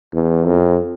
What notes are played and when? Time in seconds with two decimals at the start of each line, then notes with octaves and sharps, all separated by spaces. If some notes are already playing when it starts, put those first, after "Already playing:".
0.14 E2
0.46 F2